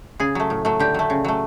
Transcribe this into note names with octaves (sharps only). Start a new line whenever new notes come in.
C#3 G#4
F#3 A3
A2
F#3 A3
D3 G4
F#3 A3
C#3
F#3 A3